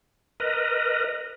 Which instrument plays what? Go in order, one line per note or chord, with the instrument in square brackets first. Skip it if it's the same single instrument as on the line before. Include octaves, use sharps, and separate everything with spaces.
[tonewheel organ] A#4 B4 D#5